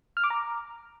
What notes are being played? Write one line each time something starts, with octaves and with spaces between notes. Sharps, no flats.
F6
D6
A#5